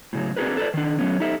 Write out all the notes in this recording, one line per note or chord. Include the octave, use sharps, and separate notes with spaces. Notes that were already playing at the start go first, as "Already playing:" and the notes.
A2 C#3 F#3
C4 D4 F#4 G#4 A#4 B4
A4 B4 D5
D#3 D4
F#3 A3 B3 C#4
D#4 G4 A4 E5